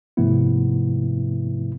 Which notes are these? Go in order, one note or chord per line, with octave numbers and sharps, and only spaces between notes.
G#2 C3 F3 A3 B3 E4